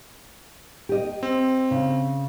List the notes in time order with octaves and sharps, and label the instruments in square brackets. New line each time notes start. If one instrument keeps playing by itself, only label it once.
[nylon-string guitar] G4 D#5
[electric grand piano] C4
[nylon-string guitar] C#3